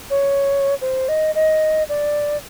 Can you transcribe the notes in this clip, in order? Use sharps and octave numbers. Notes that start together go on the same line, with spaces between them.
C#5
C5
D#5
D#5
D5